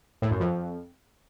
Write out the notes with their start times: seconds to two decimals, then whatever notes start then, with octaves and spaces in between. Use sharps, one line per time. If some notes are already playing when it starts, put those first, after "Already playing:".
0.22 A2
0.31 F#2
0.40 F2